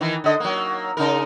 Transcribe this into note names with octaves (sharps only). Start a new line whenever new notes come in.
D#3 E3
D3 D#5
F#3 A#3
C#3 D#4 A#4